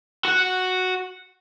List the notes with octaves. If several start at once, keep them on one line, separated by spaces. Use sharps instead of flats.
F#4 F#5